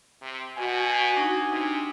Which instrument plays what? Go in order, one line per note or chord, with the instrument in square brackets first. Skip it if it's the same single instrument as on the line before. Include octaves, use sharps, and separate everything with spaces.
[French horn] C3
[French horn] B2 [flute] F#4 [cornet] G#5
[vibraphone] D4 D#4
[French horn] C3